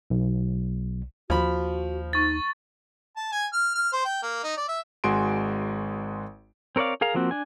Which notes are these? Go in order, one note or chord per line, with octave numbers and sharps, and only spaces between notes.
B1
D#2 F3 F#4 B5
D#4 C#6 A6
A5
G#5
F6
F6
C5
G5
A#3
D#4
D5
E5
G#1 G#3 F#4 G#5 C6 D7
C4 A#4 C#5 D5 F5
G#4 A#4 F5 A#5
F3 A#3 C4 F#4
D4 G#5